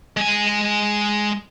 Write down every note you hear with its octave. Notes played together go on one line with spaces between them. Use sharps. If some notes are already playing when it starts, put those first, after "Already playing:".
G#3 G#5